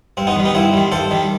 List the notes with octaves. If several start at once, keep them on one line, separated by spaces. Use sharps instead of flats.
G2 C4
B3 D#4
D#3 G3
B3 D#4
G2 C4 E4
D#3 G3
G2 A4 C5
D#3 G3